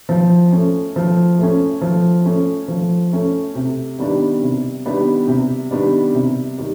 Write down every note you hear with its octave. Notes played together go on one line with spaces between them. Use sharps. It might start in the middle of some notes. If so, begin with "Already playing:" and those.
F3
A3 C#4
F3
A3 C#4
F3
A3 C#4
F3
A3 C#4
C3
D#3 G3 B3 D4
C3
D#3 G3 B3 D4
C3
D#3 G3 B3 D4
C3
D#3 G3